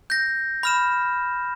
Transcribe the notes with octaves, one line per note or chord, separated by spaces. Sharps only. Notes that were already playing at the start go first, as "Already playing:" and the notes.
G6 A#6
B5 F6 E7